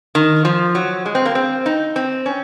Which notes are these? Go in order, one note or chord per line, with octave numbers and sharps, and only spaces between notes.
D#3
F3
F#3
G#3
C4
A#3
C4
D#4
C4
C#4